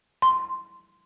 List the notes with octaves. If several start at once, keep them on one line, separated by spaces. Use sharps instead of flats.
C6